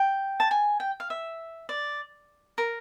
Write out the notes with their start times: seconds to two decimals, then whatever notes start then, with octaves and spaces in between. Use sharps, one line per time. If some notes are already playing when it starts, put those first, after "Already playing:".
Already playing: G5
0.40 A5
0.51 G#5
0.80 G5
1.00 F5
1.10 E5
1.69 D5
2.58 A#4